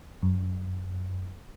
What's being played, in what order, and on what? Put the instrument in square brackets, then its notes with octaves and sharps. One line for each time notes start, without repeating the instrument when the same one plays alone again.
[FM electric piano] F#2